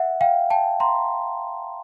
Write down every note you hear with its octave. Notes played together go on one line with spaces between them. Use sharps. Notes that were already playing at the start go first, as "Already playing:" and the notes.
Already playing: E5 F#5
F5 G5
G5 A5
A#5 C6